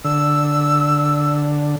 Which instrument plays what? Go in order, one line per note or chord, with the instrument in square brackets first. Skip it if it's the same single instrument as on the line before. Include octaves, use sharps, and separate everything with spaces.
[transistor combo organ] D3 [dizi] E6